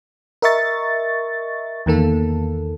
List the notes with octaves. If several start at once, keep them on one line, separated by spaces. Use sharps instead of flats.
A#4 D#5 E5 C#6 A6
E2 D#3 A#3 A4